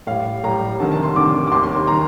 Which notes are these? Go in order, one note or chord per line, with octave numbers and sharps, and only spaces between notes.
A2 G3 F5
A2 G3 A#5
D2 C3 D#3 A5
A5
C6
D2 C3 D#3 D6
D6
D#2 D#3 G3 C6
C6
C6
D#3 G3 A#5